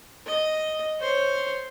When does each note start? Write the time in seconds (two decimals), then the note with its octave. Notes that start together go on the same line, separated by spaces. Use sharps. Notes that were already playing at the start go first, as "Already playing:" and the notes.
0.26 D#5
1.00 C5 C#5